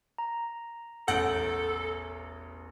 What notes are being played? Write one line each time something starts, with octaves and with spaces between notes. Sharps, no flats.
A#5
E1 A1 A4 F#5 G6 D7 F#7